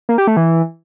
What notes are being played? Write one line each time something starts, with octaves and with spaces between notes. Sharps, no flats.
A#3
G4
A3
E3